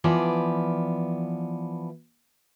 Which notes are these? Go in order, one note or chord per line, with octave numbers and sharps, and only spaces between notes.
E3 F3 B3 D5